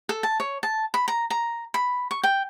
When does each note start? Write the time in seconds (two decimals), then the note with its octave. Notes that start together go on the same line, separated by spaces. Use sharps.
0.09 A4
0.23 A5
0.40 C#5
0.63 A5
0.94 B5
1.08 A#5
1.30 A#5
1.74 B5
2.11 C#6
2.23 G5